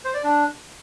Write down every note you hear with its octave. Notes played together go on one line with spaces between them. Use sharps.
C5
D5
D4